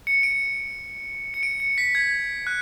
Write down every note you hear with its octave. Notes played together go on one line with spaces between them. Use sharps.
C#7
D7
C#7
D7
C#7
B6
G#6
F#6